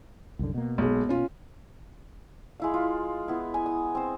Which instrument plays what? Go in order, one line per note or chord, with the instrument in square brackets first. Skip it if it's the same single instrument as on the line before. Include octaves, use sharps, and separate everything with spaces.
[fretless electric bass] C2 F#2 D3
B2 A#3
[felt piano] B1 G#3
C#4 F4
[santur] G#3 E4 F5
F4
B3 E4
G#5
D#6
C4 C5